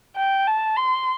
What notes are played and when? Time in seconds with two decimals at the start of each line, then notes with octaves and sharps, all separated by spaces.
0.17 G5
0.47 A5
0.76 C6